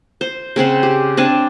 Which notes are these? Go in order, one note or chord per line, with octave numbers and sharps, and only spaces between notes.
C5
C#3 C4 C5 F#5
G4
C4 D4 G#5 A5